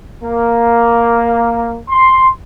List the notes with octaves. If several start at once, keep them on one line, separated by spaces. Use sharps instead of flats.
A#3
C6